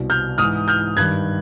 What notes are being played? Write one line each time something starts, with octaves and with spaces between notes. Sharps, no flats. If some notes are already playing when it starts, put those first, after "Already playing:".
Already playing: C2 B2
F6 G6
G#2 E3 D#6 F6
F6 G6
G2 D#3 F#6 G#6